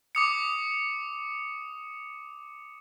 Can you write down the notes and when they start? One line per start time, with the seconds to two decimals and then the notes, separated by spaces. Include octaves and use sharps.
0.15 D6 D#6 C#7